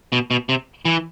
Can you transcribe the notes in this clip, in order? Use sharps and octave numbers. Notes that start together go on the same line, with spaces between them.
B2
B2
C3
E3